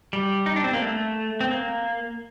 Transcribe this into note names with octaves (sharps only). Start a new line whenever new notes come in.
G3
D#4
D4
C4
A#3
A3
C4
A#3